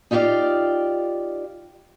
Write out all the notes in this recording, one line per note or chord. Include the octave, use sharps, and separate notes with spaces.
D#4 F4 G4 B4 D5 F5